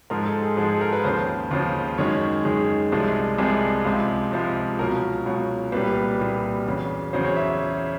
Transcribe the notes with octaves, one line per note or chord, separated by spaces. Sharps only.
G#2 F3 G#3 A#4
A4
G#4
G#2 F3 G#3 G#4
A4
A#4
B4
D#2 C#3 F3 C5
D#2 C#3 F3
F#2 D#3 G#3 C#5
F#2 D#3 G#3 G#4
C2 C3 F3 G#3
C2 C3 F3 G#3 G#4
C#2 C3 F3 G#3
C#2 C3 F3 G#3
C#2 B2 F#3 A#4
C#2 B2 F#3
C2 A#2 G3 B4
C2 A#2 G3
E2 C#3 F#3
E2 C#3 F#3 C5
C#5
E5